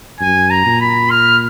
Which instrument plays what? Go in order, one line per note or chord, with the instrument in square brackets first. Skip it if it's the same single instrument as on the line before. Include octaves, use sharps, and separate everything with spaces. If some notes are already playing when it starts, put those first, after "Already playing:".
[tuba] F#2 [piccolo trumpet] G#5
[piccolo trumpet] A#5
[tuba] A#2
[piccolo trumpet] B5
F6